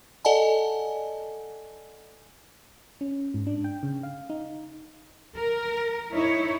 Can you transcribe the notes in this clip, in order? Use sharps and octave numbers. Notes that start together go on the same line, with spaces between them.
A4 D5 D#5 F#5 G#5 A5
C#4
G#2
D4
G5
C#3
F5
D#4
A#4
D#4 E4 C#5